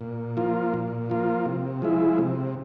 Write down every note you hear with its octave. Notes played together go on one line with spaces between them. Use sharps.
A#2
F3 A#3 F4
A#2
F3 A#3 F4
C3
F3 G#3 E4
C3